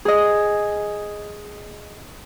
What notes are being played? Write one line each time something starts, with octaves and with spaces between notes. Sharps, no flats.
G#4 D#5